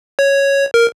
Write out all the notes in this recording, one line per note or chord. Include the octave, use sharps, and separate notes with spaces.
C#5
A#4